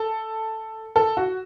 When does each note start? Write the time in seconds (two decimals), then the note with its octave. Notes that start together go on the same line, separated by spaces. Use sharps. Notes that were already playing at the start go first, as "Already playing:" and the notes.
Already playing: A4
0.96 A4
1.17 F#4